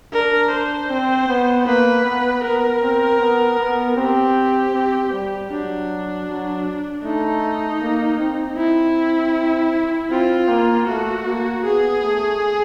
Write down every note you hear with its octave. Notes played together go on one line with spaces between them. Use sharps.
D4 A#4
C5
C4
B3
A#3 B4
B3
B3 A#4
C4
B3
B3
C4 G4
C4
G3
F#3 D4
F#3
A3 D#4
A#3
C4
E4
C4 F4
A#3
A3 F#4
A#3
B3 G#4
A3